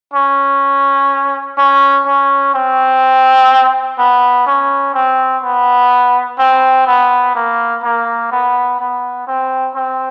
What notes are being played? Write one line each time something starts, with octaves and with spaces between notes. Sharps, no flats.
C#4
C#4
C#4
C4
B3
C#4
C4
B3
C4
B3
A#3
A#3
B3
B3
C4
C4